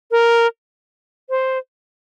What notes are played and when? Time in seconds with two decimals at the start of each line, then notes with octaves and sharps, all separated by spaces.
0.11 A#4
1.30 C5